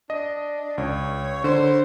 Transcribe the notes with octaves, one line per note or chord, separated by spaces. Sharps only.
D4 D#5
C#2 C#5
D3 C5